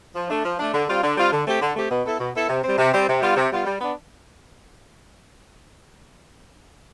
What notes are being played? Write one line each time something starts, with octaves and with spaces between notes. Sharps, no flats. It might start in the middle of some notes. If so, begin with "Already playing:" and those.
F3
A3 D4
F3
A3 D4
D3
G3 C4 F4
D3
G3 C4 F4
D3
A3 C4 G4
D3
A3 C4 G4
B2
B3 E4 A4
B2
B3 E4 A4
C3
G3 C4
C3
G3 C4
C3
G3 B3 F4
C3
G3 B3 F4
G3
B3 D4